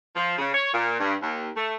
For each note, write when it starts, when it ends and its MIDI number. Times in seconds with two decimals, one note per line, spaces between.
0.16 0.38 53
0.38 0.50 49
0.54 0.70 73
0.74 0.98 46
1.00 1.15 43
1.22 1.49 39
1.56 1.74 57